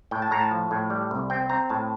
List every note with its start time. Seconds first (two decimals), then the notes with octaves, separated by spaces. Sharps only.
0.11 A2 G5
0.22 A5
0.31 A2 A#5
0.41 A5
0.51 F3
0.71 A2
0.90 G3
1.11 C2
1.30 C4 G5
1.50 C4 A#5
1.70 A2 A5